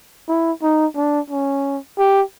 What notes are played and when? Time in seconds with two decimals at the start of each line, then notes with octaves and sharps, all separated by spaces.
0.28 E4
0.62 D#4
0.96 D4
1.30 C#4
1.98 G4